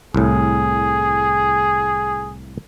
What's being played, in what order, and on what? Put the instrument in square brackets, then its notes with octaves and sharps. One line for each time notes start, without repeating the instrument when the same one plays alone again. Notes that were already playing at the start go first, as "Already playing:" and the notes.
[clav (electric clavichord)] C2 A2 [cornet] G#4